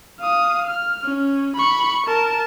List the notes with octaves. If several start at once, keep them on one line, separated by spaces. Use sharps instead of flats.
F5 D#6
F6
C#4
B5 C#6
A#4 A5